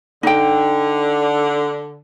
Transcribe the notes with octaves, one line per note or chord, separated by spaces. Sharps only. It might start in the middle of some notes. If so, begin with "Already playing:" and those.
D3 D#4 G5